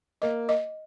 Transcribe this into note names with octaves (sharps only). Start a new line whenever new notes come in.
A#3 D#5
D#5